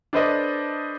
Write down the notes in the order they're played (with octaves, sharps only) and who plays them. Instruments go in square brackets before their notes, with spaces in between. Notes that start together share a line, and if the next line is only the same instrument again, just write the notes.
[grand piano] D4 A4 B4 C5 D5 D#5